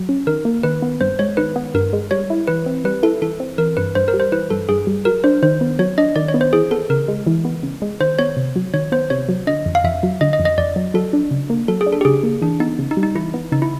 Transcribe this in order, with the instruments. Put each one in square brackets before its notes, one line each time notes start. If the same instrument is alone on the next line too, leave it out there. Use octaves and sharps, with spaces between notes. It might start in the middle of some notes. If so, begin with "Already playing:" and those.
Already playing: [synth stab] F#3
C#4
[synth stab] D#3 [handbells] A#4
[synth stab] A#3
[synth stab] D#3 [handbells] B4
[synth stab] B3
[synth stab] G2 [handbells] C5
[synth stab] G#3 [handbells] C#5
[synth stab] D#3 [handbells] B4
[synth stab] B3
[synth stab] G2 [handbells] A#4
[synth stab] G#3
[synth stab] G3 [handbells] C#5
[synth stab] E4
[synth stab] E3 [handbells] B4
[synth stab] C4
[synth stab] G3 [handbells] B4
[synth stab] E4 [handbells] A4
[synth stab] E3 [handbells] A4
[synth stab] C4
[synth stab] E3 [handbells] A#4
[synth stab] G2 [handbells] B4
[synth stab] G2 [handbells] C5
[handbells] A#4
[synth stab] G3
[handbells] C5
[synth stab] E3 [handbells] B4
[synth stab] G2 [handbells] A4
[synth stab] G2 [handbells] G#4
[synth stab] G3
[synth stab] F#3 [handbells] A#4
[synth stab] D4 [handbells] C5
[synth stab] D#3 [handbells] C5
[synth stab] B3
[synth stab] F#3 [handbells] C#5
[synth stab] D4 [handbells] D#5
[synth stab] D#3 [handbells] D5
[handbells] C#5
[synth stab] B3
[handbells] C5
[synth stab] E3 [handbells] G#4
[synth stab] B3 [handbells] A4
[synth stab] C#3 [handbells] A#4
[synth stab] G#3
E3
B3
C#3
G#3
[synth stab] D#3 [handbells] C5
[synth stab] B3 [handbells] C#5
[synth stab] C3
F#3
[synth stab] D#3 [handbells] C#5
[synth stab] B3 [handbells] C5
[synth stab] C3 [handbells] C#5
[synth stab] F#3
[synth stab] D3 [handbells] D#5
[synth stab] F2
[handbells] F5
[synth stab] F2 [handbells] E5
[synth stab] F#3
[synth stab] D3 [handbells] D#5
[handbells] D#5
[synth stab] F2
[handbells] D#5
[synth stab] F2 [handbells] D5
[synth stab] F#3
[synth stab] F#3 [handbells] A4
[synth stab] D4
C#3
A#3
[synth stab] F#3 [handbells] A4
[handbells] G#4
[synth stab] D4
[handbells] A4
G4
[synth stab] C#3 [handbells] G#4
[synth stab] A#3
[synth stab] E3 [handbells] D4
[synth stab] B3 [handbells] D#4
[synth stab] C#3
[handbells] D#4
[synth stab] G3
[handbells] D#4
[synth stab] E3 [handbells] E4
[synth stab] B3
[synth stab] C#3 [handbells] D#4
[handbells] E4